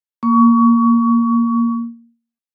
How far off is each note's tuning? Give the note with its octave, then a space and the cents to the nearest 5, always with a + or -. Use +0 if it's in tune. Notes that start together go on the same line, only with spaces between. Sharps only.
A#3 +0 C#6 +25